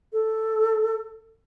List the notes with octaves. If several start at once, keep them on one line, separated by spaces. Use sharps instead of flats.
A4